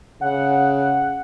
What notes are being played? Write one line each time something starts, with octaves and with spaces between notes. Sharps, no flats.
C#3 F#5